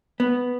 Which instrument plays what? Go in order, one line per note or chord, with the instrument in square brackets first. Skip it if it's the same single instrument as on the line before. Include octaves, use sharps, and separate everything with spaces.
[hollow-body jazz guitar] B3